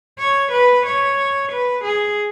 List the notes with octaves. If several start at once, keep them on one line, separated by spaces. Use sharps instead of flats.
C#5
B4
C#5
B4
G#4